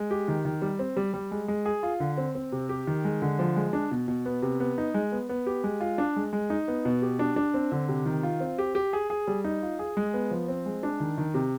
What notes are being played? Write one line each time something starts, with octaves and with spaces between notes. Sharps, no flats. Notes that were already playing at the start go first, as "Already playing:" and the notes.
Already playing: G#3
G4
D#3
D#3
G3
C4
G3
G3
G#3
G#3
G#4
F4
D3
C4
C4
C3
G4
D#3
G#3
D3
F3
G#3
D4
B2
B2
B3
C3
B3
D#4
G#3
B3
B3
G4
G#3
F4
D4
G#3
G#3
D#4
B3
B2
G4
D4
D4
C4
D3
C3
D#3
F4
C4
G4
G4
G#4
G#4
G3
D#4
F4
G#4
G#3
B3
F3
C4
G#3
D4
D#3
D#3
C3